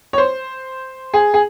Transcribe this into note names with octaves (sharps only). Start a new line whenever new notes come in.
C#5
C5
G#4
G#4